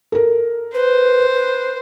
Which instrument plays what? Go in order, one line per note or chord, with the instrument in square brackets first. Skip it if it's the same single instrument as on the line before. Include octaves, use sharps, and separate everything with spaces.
[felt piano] A4 A#4
[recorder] B4 [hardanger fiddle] C5
[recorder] B4